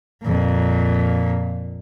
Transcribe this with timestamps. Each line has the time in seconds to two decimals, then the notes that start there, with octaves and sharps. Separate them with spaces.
0.23 F2 A#2